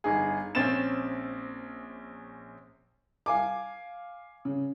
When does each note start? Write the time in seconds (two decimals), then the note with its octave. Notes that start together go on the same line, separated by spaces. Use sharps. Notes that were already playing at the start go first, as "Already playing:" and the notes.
0.04 G1 D#4 G#4
0.55 A#1 C4 C#4 A6 E7
3.26 F5 G#5 D6
4.45 C#3